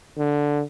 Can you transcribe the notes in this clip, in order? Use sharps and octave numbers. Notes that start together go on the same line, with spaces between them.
D3